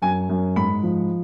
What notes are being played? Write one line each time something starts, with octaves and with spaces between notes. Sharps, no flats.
F#2 G#5
F#2
G#2 B5
F3